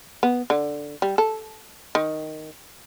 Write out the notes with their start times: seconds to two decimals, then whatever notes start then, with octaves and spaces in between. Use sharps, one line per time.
0.23 B3
0.50 D3
1.02 G3
1.18 A4
1.95 D#3